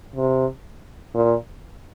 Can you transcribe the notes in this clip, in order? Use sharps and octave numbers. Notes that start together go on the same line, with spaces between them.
C3
A#2